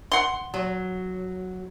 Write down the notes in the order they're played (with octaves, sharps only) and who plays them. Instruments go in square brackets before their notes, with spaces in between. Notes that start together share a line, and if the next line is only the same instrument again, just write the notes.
[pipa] F#5 C6
[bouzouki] F#3